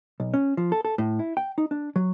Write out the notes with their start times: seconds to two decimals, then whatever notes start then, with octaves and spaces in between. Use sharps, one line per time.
0.20 B1
0.34 C#4
0.57 F3
0.72 A4
0.85 A4
0.98 A2
1.19 E4
1.37 G5
1.58 D#4
1.71 D4
1.96 F#3